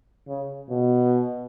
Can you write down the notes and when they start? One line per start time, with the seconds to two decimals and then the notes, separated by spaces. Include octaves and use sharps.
0.28 C#3
0.69 B2